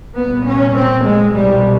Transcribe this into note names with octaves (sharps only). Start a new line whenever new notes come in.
C2 A#2 B3
C#4
C4
G#3
C2 B2 G3